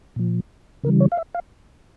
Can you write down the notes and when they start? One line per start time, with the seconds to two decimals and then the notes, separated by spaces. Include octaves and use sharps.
0.16 A#2 F3
0.84 C#3 E3 G3 A#4
1.00 C#5
1.12 F5
1.17 E5
1.35 F5